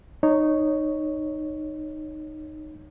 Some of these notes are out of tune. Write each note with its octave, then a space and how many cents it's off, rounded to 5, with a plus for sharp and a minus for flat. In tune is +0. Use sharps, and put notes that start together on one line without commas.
D#4 -15 C#5 +0